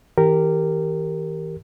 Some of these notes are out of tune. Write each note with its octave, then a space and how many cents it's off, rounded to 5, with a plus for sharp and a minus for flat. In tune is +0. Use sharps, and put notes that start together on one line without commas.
E3 -45 G4 +0 A#4 -15